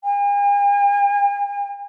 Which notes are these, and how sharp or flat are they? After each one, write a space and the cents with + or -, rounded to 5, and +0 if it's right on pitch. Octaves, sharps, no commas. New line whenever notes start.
G#5 -45